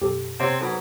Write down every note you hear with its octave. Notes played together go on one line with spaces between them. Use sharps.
F#2 B2 G4 A4
C3 C4 C#5 F#5 G#6
G#2 F#3 A4 B4